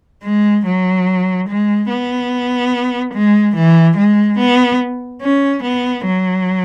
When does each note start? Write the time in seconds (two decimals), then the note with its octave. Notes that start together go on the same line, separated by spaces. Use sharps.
0.23 G#3
0.66 F#3
1.48 G#3
1.90 B3
3.14 G#3
3.55 E3
3.97 G#3
4.38 B3
5.22 C#4
5.63 B3
6.05 F#3